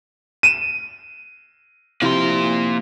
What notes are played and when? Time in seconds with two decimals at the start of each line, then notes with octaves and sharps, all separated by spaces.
0.43 D#7 E7
2.02 C3 F3 A#3 E4 C6